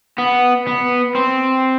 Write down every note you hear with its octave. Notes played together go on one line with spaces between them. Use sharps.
B3
B3
C4